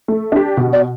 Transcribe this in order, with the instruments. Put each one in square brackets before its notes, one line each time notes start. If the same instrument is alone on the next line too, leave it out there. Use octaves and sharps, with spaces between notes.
[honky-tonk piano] A3
D4 G4
B2
[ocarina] D5